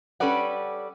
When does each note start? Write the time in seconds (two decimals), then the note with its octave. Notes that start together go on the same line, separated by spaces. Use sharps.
0.20 G3 C#4 A4 B4 D5 F#5